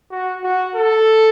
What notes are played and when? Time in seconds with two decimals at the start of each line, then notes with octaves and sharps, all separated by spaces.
0.11 F#4
0.43 F#4
0.76 A4